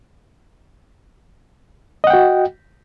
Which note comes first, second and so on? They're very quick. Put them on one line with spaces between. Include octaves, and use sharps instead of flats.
D#5 F#5 G5 F#4